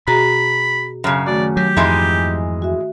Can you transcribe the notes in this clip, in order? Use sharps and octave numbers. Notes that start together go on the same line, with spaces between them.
B2 F#4 G#4 A#5 B5
F#2 C#3
D#3 A3 F#4 D5
F#3 G4
F2 G#2 E3 G#3
F#4 E5